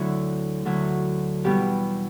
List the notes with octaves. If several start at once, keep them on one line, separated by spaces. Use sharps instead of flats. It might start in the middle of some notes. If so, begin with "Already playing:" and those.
Already playing: D2 D3 F#3 E4 F#4
D2 D3 F#3
E2 B2 G3 G4